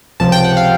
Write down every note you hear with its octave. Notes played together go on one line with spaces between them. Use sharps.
C#2 C3 F3 A5
G5
F#5
F5